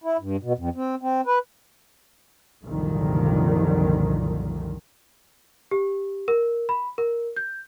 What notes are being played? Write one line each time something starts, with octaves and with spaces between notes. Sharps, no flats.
E4
G2
B2
F2
C4
C4
B4
C2 F#2 A#2 D3 D#3 F3
G4
A#4
B5
A#4
G6